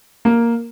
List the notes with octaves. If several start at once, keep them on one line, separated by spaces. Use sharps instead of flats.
A#3